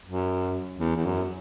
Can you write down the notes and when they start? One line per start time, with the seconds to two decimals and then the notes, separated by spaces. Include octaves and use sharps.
0.05 F#2
0.80 E2
0.96 E2
1.05 F#2